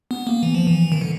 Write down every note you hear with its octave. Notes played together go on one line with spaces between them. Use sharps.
B3
A#3
E3
F3
E3
D#3
D3